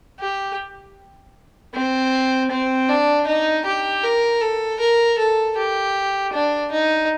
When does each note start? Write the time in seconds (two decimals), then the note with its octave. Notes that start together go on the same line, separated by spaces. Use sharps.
0.20 G4
1.74 C4
2.51 C4
2.89 D4
3.27 D#4
3.66 G4
4.03 A#4
4.41 A4
4.80 A#4
5.18 A4
5.57 G4
6.33 D4
6.72 D#4